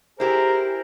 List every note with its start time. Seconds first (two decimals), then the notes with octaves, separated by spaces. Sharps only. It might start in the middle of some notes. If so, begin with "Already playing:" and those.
0.20 E4 G4 G#4 A#4 C5